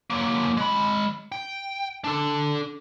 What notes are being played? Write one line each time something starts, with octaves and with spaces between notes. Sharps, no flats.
F#3 A#3
G#3 B5
G5
D4 A4